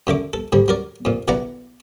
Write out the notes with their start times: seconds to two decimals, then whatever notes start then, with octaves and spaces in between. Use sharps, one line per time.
0.07 F#2 D3 E5 D6
0.33 A4
0.52 G#2 D3 G3
0.68 F#3 A#4 D5
1.05 F2 A#2
1.28 B1 E3 D5 F#5 A#5